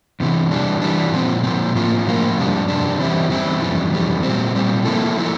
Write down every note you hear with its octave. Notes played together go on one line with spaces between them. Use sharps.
E2 C3 E3
E3 G3 D4
E3 G3 D4
A#2 F3 C4
A#2 F3 C4
A2 F3 A#3 F4
A2 F3 A#3 F4
F2 C3 G3 D4
F2 C3 G3 D4
E2 E3 G3 C4 E4
E2 E3 G3 C4 E4
F2 E3 G3
F2 E3 G3
A#2 G3 C4
A#2 G3 C4
F3 A#3 E4 A4
F3 A#3 E4 A4